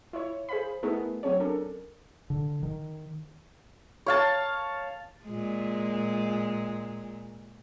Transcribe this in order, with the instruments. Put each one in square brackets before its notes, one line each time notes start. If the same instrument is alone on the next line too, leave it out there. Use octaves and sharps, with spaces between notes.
[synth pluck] E4 F4 C#5
G#4 C5 F5 B5
A3 B3 D#4 E4 G#4 A#4
F#3 C4 C#4 G#4 C#5
C#4 D4 A4 A#4
[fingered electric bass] D3
D#3
[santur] C#5 F5 A5
[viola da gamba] A#2 G#3